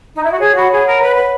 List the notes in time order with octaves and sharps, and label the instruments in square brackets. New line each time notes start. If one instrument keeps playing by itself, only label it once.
[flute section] D#4
E4
F#4
[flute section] G#4 [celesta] C#5
[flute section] F#4 [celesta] F#5 B5
[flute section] G#4 [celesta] C#5
[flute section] A#4 [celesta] F#5 B5
[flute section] B4 [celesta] C#5
[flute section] B4 [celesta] F#5 B5